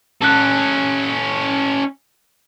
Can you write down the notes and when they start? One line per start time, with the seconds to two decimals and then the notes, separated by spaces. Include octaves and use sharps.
0.22 C#4 A4 A5 F#6